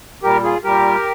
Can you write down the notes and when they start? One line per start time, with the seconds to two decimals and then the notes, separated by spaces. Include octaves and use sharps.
0.23 A#2 G3 G4 A#4
0.44 F4 G#4
0.64 A#2 G3 G4 A#4